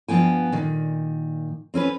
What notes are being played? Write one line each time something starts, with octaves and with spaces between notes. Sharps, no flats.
G2 F3 B3 G5 G#5
A#2 D#3
C4 C#4 A#4 B4